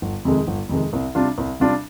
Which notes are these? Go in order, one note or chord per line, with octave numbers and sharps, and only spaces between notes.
G1
F2 C3 D#3 G#3
G1
F2 C3 D#3 G#3
C2
C3 G3 D4 F4
C2
C3 G3 D4 F4